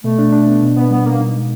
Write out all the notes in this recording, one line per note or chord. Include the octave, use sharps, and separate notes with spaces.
B2 A3
D4
D4
B3
B2
B2 B3
G3 B3
B2 A#3
D#4
G#3